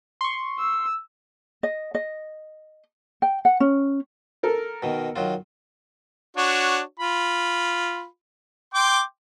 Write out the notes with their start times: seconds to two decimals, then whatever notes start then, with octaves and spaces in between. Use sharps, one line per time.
0.21 C6 C#6
0.59 E6
1.63 D#5
1.95 D#5
3.22 G5
3.45 F#5
3.60 C#4
4.43 A4 A#4
4.82 B2 D#3
5.16 D#3 F#3 F4
6.37 D4 F#4 C#5
7.00 F4 B5
8.74 G5 C6 D6